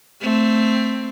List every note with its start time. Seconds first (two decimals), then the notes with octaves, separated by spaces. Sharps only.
0.21 A3 C4